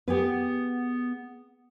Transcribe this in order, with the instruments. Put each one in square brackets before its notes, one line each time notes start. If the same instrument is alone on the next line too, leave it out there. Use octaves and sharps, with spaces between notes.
[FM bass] B3 [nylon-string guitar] G4 G#4 B4